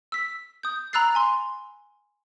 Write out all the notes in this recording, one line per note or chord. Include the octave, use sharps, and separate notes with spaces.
E6 B6
D#6 G6
A#5 B5 E6 F#6 A6 C7
G#5 C6